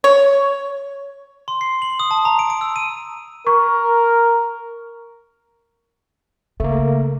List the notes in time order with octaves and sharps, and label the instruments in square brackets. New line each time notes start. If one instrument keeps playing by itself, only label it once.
[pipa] C#5
[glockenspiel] C6
C7
F#7
D#6
A5
A#5
D7
D7
E6
D#7
[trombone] A#4 [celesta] C#6
[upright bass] C#3 [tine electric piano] A3 A#3